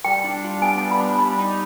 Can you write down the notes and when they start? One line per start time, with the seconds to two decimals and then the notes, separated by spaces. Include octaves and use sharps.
0.04 G3 G5
0.24 D4
0.44 F4
0.62 B3 G#5
0.81 G3
0.91 B5
1.00 D4
1.19 G3 B5
1.39 D#4